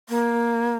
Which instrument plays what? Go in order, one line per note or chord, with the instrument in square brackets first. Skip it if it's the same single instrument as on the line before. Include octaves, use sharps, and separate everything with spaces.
[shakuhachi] A#3